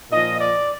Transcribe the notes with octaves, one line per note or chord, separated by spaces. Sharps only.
A#2 F3 D#5
D5